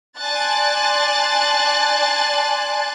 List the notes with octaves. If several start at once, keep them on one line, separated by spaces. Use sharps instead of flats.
D5 G#5 A5 C6 F#6 A6